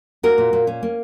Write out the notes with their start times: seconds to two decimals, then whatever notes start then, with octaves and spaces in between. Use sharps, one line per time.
0.23 A#3 F#4 A#4
0.38 A#2
0.53 A#2
0.67 C#4
0.83 A#3